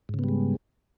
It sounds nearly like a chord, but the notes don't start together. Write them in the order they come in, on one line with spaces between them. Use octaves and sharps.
G#2 C#3 B3 G3 G#3